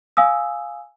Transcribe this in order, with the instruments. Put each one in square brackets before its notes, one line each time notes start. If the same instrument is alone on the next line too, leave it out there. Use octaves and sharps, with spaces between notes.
[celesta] F5 G#5 D#6 E6